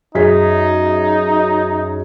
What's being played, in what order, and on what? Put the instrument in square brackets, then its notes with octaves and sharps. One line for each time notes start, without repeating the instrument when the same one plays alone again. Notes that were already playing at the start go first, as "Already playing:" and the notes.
[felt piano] F#2 G#4 B6 [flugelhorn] D#4